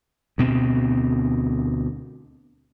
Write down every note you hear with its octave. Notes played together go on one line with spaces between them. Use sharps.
D2 B2 C4